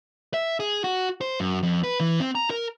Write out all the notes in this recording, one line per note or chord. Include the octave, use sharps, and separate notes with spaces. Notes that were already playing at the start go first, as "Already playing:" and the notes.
E5
G#4
F#4
C5
F#2
F2
B4
E3
C4
A#5
A#4